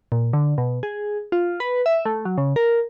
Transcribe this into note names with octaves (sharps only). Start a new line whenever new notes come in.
A#2
D3
B2
G#4
F4
B4
E5
A3
F#3
C#3
A#4